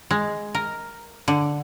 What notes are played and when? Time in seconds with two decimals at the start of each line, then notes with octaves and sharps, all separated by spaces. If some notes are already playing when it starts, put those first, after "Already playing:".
0.11 G#3
0.55 A#4
1.28 D3